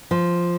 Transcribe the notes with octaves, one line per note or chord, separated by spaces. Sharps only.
F3